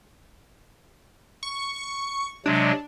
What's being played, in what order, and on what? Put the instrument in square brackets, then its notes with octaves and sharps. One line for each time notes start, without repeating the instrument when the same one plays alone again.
[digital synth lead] C#6
[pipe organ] C3 F#3 G#3 [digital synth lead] D4